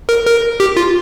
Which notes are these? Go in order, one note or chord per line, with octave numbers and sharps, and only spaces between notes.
A#4
A#4
G4
F4